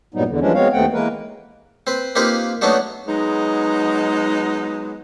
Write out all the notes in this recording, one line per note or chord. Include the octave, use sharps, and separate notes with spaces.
G2 A#2 F#3 G3 B3 D#4
E2 D3
E3 F3 G3 G#3 C#4 D4
F#3 G#3 B3 C4 C#5 F5
D#2 A3 B3 C4 F#5 G5
E3 G#3 A#3 A#4 B4
C4 B4
A#3 C4 D#4 F4 G4 B4
F#3 A3 B3 D4 D#4 F#4
F#3 G#3 B3 D#4